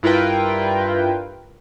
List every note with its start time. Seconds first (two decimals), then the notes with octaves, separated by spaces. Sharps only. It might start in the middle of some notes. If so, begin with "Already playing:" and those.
0.03 G2 E4 F4 A#4 B4 G5